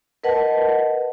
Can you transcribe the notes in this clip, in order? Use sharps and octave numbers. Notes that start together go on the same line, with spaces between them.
A#4 B4 D#5 F#5 A5